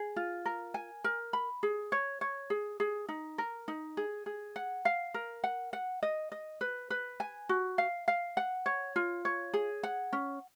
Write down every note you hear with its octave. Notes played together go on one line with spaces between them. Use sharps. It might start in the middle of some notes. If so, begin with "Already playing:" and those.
Already playing: G#4
F4
A#4
G#5
A#4
B5
G#4
C#5
C#5
G#4
G#4
D#4
A#4
D#4
G#4
G#4
F#5
F5
A#4
F#5
F#5
D#5
D#5
B4
B4
G#5
F#4
F5
F5
F#5
C#5
F4
C#5
G#4
F#5
C#4